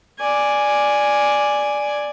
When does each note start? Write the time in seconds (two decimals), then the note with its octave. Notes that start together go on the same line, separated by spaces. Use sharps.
0.19 D5 G#5